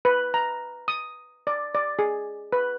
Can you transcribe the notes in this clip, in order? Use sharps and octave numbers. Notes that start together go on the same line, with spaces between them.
B4
A#5
D#6
D5
D5
G#4
B4